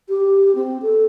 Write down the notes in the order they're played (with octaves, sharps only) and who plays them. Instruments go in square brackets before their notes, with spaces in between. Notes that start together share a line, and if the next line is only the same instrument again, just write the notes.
[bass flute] G4
C4
A4